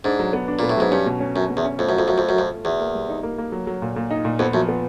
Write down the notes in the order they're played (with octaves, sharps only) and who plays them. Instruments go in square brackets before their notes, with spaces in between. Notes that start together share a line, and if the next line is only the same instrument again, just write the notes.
[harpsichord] G#2 [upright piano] D4
[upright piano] F#3
B3
D4
[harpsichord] A#2 [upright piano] B3
[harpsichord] A2
[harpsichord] G#2 [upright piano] F#3
[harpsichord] G2 [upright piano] C#4
[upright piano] B2
C#4
[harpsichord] F#2 [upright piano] C#4
[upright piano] B2
[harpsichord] E2
[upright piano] C#4
[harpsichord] F2 [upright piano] A3
[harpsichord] F#2 [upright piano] F4
[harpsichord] F2
[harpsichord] F#2 [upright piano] F4
[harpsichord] F2 [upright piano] A3
[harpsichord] F#2
[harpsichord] F2 [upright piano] F4
[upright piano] A3
[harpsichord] E2 [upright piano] F#4
[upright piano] A#3
G3
D#4
A#3
A#3
F#3
F#3
A#2
A#2
D#4
A#2
[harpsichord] F2 [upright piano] B3
[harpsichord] F#2 [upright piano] F3
[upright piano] B3